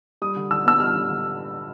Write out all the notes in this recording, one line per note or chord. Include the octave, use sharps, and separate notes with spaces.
G3 D#6
D3
D3 E6
B3 E6
G3 F6
D3
D3